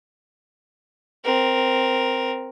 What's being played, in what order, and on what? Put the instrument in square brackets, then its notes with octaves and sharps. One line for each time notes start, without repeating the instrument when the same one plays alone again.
[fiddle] C4 A#4